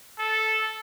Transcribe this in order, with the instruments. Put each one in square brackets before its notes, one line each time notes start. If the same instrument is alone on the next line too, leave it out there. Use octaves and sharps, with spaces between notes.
[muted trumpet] A4